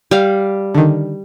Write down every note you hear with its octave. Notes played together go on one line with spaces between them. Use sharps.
G3 F5
D3 D#3